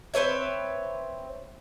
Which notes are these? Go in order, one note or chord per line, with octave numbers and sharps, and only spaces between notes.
C4 B4 C#5 E5